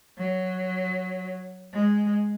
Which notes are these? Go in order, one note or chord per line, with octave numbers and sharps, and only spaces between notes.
F#3
G#3